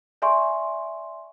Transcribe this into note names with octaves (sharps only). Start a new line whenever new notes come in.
D5 E5 G#5 C6 C#6